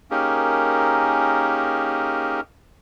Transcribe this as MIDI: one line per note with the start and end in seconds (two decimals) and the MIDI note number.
0.11 2.40 58
0.11 2.40 61
0.11 2.40 63
0.11 2.40 67
0.11 2.40 68
0.11 2.40 70